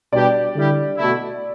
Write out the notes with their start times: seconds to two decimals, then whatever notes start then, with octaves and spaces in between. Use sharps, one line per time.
0.12 B2 G3 D4 G4 D5
0.54 D3 G3 E4 G4
0.97 B2 A3 E4